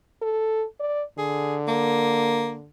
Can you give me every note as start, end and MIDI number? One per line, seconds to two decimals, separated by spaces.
0.22 0.65 69
0.80 1.03 74
1.18 2.67 50
1.18 1.56 68
1.68 2.58 58